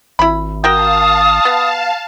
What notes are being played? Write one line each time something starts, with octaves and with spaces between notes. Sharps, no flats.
G#1 E4 B5
F#4 A#4 F5 G5 A5 D#6
B3